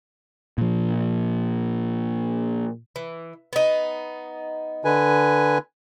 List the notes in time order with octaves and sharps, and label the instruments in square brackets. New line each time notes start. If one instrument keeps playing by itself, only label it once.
[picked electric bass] A#2 F3
[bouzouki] E3
B3 D#4
[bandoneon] D3 B4 G#5